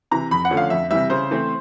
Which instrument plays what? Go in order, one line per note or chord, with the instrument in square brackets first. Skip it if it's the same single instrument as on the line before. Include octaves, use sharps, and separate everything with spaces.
[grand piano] C3 E3 A#5
F2 B5
F#5
D3 F3 A3 C#4
F5
F2 E5
C3 E3 G3 E5
C#3 C5
E3 A3 C4